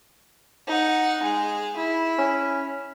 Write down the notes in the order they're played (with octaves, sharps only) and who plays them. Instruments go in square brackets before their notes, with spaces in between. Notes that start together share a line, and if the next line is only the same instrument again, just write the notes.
[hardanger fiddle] D#4 F#5
G#3 G#4
E4
[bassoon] C#4